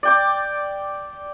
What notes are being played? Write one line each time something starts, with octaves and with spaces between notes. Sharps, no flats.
D5 G5 D6